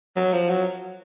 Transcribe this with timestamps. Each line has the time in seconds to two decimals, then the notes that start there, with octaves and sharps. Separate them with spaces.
0.16 F#3
0.32 F3
0.49 F#3